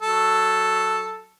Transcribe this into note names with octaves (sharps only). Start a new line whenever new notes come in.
F#3 A4